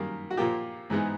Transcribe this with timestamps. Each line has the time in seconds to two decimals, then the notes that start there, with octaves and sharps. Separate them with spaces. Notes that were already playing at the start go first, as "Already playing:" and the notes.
Already playing: F#2 D#3 G3 A#3
0.30 F#4
0.37 A#2 F3 A#3 F4 G4
0.90 G#2 E3 G#3 B3 D#4